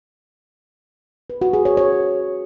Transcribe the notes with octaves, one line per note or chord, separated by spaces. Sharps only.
B4
F#4
G#4
C#5
C#5